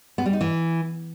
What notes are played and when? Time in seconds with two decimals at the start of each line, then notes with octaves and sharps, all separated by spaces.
0.18 B3
0.26 G3
0.33 D#4
0.41 E3